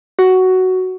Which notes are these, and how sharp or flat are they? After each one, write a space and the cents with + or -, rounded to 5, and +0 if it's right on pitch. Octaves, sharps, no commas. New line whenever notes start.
F#4 +10